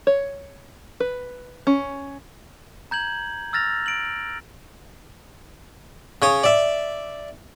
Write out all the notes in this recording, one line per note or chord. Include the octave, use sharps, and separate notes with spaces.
C#5
B4
C#4
A#5 G6 G#6 F#7
E6 F6 A6 A#6 F7
D7 F#7
C#3 C#5 D#6
D5 E5